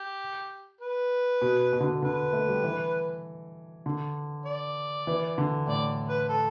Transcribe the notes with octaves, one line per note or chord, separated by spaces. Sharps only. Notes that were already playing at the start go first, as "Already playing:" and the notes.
Already playing: G4
B4
B2
B2
D3
B2
D3 B4
A3
G3
E3
D3
D5
E3
D3
A2 D5
B4
A4